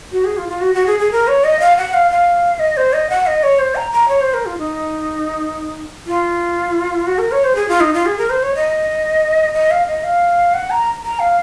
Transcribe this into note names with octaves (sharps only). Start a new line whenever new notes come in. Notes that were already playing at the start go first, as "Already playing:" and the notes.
F#4
G#4
F4
F4
F#4
F#4
G#4
G#4
A#4
C#5
D#5
F5
F#5
F5
F5
D#5
C5
D#5
F#5
D#5
C#5
C5
A#5
A#5
C#5
C5
A#4
F4
D#4
F4
F#4
A#4
C#5
C5
G#4
F4
D#4
F4
G#4
A#4
C5
C#5
D#5
D#5
F5
D#5
F5
F#5
A#5
A#5
F5